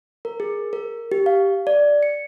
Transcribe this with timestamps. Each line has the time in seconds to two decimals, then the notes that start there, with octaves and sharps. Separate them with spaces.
0.25 A#4
0.40 G#4
0.73 A#4
1.12 G4
1.26 F5
1.67 D5
2.03 C#7